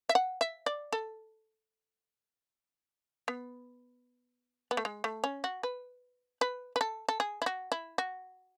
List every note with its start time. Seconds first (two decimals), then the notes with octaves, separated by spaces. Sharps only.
0.09 E5
0.15 F#5
0.41 E5
0.66 D5
0.92 A4
3.28 B3
4.71 B3
4.77 A3
4.85 G#3
5.04 A3
5.24 C#4
5.44 F#4
5.63 B4
6.41 B4
6.76 B4
6.81 A4
7.09 A4
7.20 G#4
7.42 E4
7.46 F#4
7.72 E4
7.98 F#4